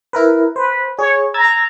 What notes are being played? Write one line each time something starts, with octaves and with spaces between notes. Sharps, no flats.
E4 A#4 B4
B4 C5
G#4 C#5
A#5 E6 G#6 A6